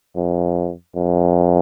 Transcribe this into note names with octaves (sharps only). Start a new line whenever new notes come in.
F2
F2